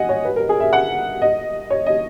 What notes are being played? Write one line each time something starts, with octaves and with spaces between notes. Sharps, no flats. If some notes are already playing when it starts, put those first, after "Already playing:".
Already playing: D#5 F#5 G#5
C#5
B4
A#4
G#4
E5
F#5
D#5
C#5
D#5